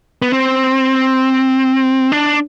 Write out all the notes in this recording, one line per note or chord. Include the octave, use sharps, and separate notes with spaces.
B3
C4
D4